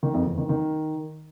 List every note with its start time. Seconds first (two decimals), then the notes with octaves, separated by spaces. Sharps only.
0.03 D#3
0.14 F2
0.26 E2
0.38 D#3
0.49 D#3